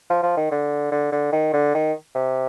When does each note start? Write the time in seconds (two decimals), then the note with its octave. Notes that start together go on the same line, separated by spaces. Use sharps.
0.10 F3
0.23 F3
0.37 D#3
0.51 D3
0.92 D3
1.12 D3
1.33 D#3
1.53 D3
1.75 D#3
2.15 C3